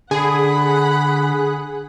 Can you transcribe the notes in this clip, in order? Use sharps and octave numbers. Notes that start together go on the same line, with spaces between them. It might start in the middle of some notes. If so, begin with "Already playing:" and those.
D3 G#4 F#5 B5